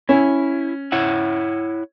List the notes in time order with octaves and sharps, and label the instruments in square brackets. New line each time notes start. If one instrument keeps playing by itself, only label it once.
[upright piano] C#4 [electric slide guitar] E4
[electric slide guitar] E4 C#5 F#5